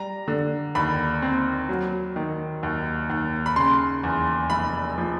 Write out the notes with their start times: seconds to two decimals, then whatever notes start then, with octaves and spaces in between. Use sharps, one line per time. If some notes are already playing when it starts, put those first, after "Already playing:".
Already playing: G3 A#5
0.28 D3
0.75 D#2 B5
1.22 C4
1.69 F#3
2.16 D#3
2.63 D#2
3.10 D#2
3.46 B5
3.56 C#3 C6
4.04 E2
4.50 F1 B5
4.98 F3